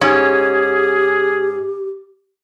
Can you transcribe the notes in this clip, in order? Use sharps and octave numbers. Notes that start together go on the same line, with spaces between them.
G#2 C#4 G4 G#4